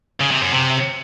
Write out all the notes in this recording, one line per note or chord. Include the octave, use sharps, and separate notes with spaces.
C#3
C3
F#2
C3